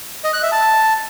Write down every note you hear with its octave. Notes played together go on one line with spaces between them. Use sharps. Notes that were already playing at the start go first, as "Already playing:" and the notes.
D#5
F#6
E5
A5